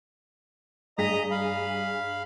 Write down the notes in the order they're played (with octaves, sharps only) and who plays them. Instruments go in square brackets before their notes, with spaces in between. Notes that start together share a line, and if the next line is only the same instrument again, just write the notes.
[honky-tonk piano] G2 G#4 B6 [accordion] D#5 A#5 D#6
[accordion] F5 B5